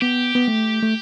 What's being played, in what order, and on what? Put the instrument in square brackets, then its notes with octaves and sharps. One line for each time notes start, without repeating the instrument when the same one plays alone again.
[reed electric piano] B3 [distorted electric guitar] G4
[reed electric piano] B3
A3
A3